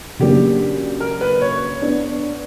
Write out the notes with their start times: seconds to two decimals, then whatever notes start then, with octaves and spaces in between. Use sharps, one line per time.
0.19 C#3 F#3 A#3 D4 G4
1.00 A#4
1.21 B4
1.42 C#5
1.82 B3 D4